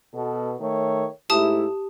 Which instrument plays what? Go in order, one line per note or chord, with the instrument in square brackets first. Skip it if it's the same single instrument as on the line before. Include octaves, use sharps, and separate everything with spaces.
[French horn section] B2 A4
D#3 A3 C#5
[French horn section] G#2 A3 E4 [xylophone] G4 A5 D#6